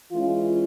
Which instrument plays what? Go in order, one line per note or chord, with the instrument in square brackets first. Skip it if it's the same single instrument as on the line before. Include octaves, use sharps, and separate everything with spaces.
[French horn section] E3 G#3 C#4 F4